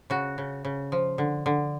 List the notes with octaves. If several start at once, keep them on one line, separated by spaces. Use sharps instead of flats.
C#3 F#4
C#3
C#3
F3
D3
D3